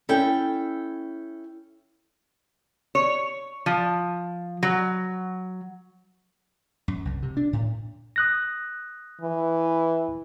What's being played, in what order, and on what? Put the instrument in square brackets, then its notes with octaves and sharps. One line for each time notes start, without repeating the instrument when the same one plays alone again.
[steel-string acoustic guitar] C#4 E4 A4 G5
[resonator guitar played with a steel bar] C#5
F3
F#3
[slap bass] F#2
C2
C3
D4
A2
[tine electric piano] D#6 F#6 A#6
[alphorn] E3